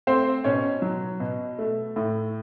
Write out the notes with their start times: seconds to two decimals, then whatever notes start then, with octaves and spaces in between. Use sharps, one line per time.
0.07 A3 C4 C5
0.44 B2 C#4 C#5
0.82 F#3
1.20 B2
1.59 A3
1.96 A2